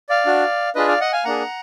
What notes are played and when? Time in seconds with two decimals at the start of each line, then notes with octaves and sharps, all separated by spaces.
0.09 D5 F5
0.26 D4 F#4
0.75 D4 F4 G#4 B4 D#5
0.88 D5 F5
1.00 D#5 F#5
1.13 F5 G#5
1.25 A#3 D4 G#4 F#5 A#5